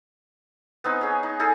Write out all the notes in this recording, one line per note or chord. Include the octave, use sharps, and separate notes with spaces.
B3 C4 D#4
C#4 G#4
D#4
D#4 G#4 A4